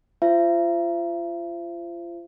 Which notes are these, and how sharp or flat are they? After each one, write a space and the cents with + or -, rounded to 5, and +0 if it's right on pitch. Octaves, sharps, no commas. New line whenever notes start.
F4 -30 C5 +0 E5 +45